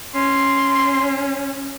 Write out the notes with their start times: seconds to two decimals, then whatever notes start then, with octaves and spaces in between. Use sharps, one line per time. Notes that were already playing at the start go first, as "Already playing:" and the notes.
0.15 C#4 C6